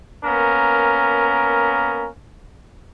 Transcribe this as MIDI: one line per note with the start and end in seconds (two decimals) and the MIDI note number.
0.25 2.08 58
0.25 2.08 59
0.25 2.08 61
0.25 2.08 70